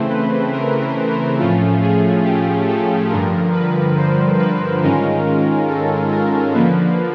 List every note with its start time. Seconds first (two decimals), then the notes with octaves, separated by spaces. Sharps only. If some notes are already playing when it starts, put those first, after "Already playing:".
Already playing: C#3 E3 A3 C4 C5
0.10 B4
0.52 A#4
0.81 B4
1.10 A#4
1.38 A2 F3 A3 C#4 F4
1.81 G#4
2.24 G4
2.67 A4
3.10 G2 D3 F3 A#4
3.53 B4
3.97 C5
4.39 B4
4.82 G#2 D#3 G#3 C#4 F4 A#4
5.68 A4
6.12 A#4
6.54 D3 F3 A#3 B4